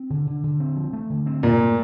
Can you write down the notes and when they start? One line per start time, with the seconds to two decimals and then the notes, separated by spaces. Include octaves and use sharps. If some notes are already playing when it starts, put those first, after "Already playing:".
Already playing: C4
0.10 D3
0.27 D3
0.44 D3
0.60 C4
0.76 F3
0.93 A3
1.10 D3
1.26 C4
1.43 G2 A#2
1.60 A3